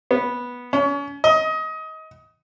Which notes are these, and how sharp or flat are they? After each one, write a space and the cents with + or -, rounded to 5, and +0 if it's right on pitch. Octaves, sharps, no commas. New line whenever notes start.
B3 -10
C#4 +35
D#5 +25